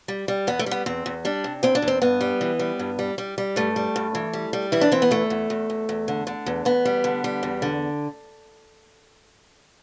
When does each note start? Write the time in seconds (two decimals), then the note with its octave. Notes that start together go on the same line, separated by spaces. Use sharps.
0.08 G3
0.28 G3
0.47 E2 B3
0.59 A3
0.66 G3
0.71 B3
0.86 E2 C4
1.06 E2
1.25 G3 D4
1.44 C3
1.63 E2 C4
1.75 D4
1.82 E2
1.88 C4
2.02 G2 B3
2.21 G3
2.41 E3
2.59 G3
2.79 G2
2.99 G3
3.18 G3
3.38 G3
3.56 G2 A3
3.76 G3
3.96 G2
4.15 E3
4.33 G3
4.53 G3
4.72 E3 E4
4.81 D4
4.92 E3 C4
5.02 B3
5.11 E2 A3
5.30 E2
5.50 E2
5.70 E2
5.89 E2
6.08 D3
6.27 D3
6.46 E2
6.65 E2 B3
6.85 G3
7.04 D3
7.24 G3
7.43 E2
7.62 D3